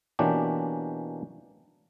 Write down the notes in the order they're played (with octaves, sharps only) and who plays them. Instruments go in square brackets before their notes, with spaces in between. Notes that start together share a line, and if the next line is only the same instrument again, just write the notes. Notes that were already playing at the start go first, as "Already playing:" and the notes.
[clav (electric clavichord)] B2 E3 A#3 C#4 D4 G4